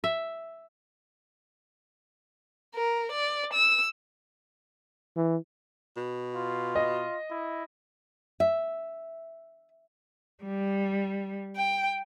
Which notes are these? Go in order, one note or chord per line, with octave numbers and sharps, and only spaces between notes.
E5
A#4
D5
E6
E3
B2
F4
D#5
E4
E5
G3
G5